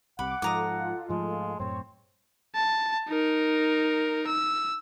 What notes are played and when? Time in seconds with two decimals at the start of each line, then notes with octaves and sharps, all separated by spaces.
0.19 C2 C3 F#5 B5 D6
0.42 G#2 F3 F4 A4 D#5 A#5 D6
1.09 G#2 F3 G#3 A3
1.60 F#2 A2 C4 C#5
2.55 A5
3.09 D#4 A#4
4.27 E6